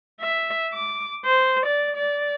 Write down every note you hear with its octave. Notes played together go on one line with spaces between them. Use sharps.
E5
D6
C5
D5
D5